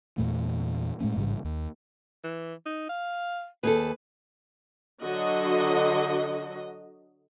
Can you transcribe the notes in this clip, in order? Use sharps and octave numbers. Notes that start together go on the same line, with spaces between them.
E2 A#2 E3 A3
A2 G#3 A3 C#4
A1 G#2 C#3 G3
D#2
E3
D#4
F5
D#2 G#4 A4 B4
D3 F#3 F#4 D#5